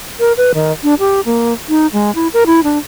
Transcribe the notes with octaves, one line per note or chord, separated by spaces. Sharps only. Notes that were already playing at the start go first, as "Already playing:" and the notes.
A#4
B4
D#3
D4
G4
A#3
D#4
G#3
E4
A#4
E4
D4